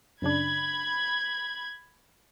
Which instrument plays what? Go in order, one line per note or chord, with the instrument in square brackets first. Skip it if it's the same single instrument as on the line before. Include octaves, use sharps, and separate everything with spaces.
[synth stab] F#2 C#3 D4 [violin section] B5 G#6